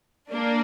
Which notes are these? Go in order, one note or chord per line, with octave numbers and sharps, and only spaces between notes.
A#3 D4